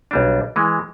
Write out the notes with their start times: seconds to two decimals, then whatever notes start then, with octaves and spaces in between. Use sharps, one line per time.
0.11 B1 G3 D4
0.56 E3 G#3